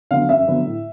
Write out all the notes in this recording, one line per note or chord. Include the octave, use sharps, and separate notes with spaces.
D3 F#3 B3 F5
F#2 E5
D3 F#3 B3
A2